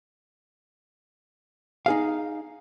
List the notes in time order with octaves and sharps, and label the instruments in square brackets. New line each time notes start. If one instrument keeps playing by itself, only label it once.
[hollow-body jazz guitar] D#4 G#4 F5